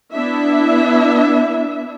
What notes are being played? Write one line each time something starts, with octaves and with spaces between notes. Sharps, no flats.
B3 D4 E4 E5